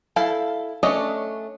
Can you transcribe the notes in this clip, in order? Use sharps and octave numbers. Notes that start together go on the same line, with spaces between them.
E4 A4 F5
A3 C#4 D4 D#5